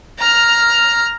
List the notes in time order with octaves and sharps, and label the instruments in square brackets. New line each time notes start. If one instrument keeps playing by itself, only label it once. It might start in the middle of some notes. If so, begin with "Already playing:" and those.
[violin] A#5 F6